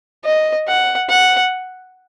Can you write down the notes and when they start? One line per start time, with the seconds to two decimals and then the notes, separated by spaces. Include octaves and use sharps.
0.25 D#5
0.67 F#5
1.10 F#5